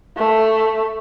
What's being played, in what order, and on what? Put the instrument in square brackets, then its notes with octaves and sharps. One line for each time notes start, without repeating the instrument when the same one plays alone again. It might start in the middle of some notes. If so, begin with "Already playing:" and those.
[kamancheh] A3